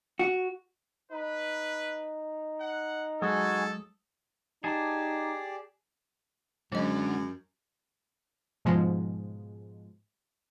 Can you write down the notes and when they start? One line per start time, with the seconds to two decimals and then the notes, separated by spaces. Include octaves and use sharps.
0.19 F#4
1.12 D#4 B4
2.61 F#5
3.22 F#3 G#3 F#4 G#4 A4 G#5 D#6
4.64 D#4 G4 G#4 D5 A5
6.72 F#2 D3 F#3 G#3 D#5
8.65 G#2 B2 F3 G#3